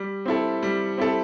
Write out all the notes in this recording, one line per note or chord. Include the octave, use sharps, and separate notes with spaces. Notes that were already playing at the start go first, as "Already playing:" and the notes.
Already playing: G3
C4 E4 A4
G3
C4 E4 A4